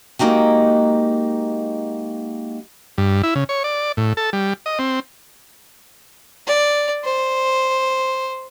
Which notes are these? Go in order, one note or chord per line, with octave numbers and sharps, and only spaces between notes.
G#3 A#3 D#4 F#4 G4
G2
E4
C#3
C#5
D5
A2
A4
G3
D#5
C4
D5
C5